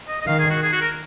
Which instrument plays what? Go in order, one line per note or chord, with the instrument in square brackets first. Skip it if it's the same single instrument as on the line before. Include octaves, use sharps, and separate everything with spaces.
[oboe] D#5
D#5
[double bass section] D#3 [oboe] F5
[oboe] G#4
F#4
G#4
F#4
A#4